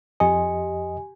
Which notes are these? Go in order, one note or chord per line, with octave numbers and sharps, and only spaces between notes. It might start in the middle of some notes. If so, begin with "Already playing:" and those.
F2 G4 D#5 G#5